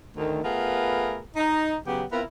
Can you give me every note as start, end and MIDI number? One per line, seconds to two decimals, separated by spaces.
0.17 0.40 38
0.17 0.40 51
0.43 1.19 57
0.43 1.19 59
0.43 1.19 65
0.43 1.19 68
0.43 1.19 70
0.43 1.19 71
1.36 1.75 63
1.36 1.75 75
1.86 2.04 49
1.86 2.04 54
1.86 2.04 59
1.86 2.04 67
2.11 2.22 59
2.11 2.22 60
2.11 2.22 64
2.11 2.22 65
2.11 2.22 70